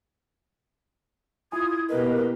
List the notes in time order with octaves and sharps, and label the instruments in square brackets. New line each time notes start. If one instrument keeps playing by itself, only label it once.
[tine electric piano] E4 G#5 [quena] F4 [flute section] D#6 G#6
[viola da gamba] B2 A#3 G4 [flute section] A#4 D#5 [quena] B4